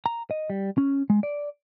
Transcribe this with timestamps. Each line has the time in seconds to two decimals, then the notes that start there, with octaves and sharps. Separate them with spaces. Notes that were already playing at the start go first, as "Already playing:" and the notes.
0.06 A#5
0.31 D#5
0.50 G3
0.78 C#4
1.10 G#3
1.23 D5